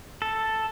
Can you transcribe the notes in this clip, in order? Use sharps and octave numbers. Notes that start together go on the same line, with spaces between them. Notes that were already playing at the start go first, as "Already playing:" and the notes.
A4